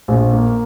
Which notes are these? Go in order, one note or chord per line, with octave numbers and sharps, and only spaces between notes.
A#1
A#3